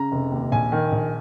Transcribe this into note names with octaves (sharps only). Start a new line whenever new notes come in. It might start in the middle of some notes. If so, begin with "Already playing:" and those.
Already playing: C#3 A#5
F1
D#2
A#1 G#5
D#3
A#1